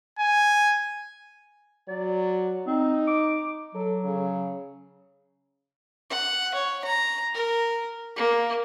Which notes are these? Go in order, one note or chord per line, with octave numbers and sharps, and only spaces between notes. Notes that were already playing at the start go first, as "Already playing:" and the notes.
G#5
F#3 D5
C4 D#4
D6
F#3 A4
C#3
F#5
C#5
A#5
A#4
A#3